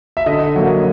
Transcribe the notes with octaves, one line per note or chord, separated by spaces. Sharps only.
E5
D3 D#5
F#3 A#3